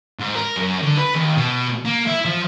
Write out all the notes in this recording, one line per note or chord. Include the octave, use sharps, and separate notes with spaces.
G#2
A#4
F#2
D3
B4
D#2
B2
A#3
E4
F3